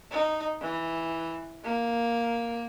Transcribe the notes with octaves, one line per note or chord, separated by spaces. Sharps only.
D#4
E3
A#3